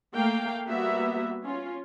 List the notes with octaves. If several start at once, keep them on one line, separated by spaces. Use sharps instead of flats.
A3 A#3 F5 G5
G3 A#3 B3 F#4 E5
C#4 F4